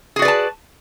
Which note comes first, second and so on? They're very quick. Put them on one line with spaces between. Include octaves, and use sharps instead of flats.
G#4 F#4 D5 B4 A5